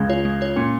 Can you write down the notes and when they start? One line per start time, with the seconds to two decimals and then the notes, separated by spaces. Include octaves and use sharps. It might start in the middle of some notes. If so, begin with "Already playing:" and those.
Already playing: C#2 C#3 G#3
0.09 F4 C#5
0.25 G#3
0.41 F4 C#5
0.56 A#2 C#4